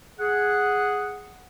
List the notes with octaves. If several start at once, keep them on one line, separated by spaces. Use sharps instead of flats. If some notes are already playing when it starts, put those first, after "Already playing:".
G#4 F#5